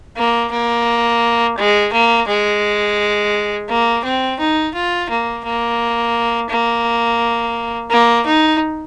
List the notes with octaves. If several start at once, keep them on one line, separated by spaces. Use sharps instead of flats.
A#3
A#3
G#3
A#3
G#3
A#3
C4
D#4
F4
A#3
A#3
A#3
A#3
D#4